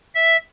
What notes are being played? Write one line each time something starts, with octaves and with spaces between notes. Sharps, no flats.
E5